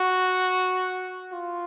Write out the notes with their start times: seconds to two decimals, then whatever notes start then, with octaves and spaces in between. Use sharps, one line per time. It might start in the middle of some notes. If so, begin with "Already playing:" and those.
Already playing: F#4
1.33 F4